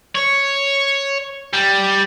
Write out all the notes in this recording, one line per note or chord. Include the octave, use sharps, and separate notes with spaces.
C#5
G3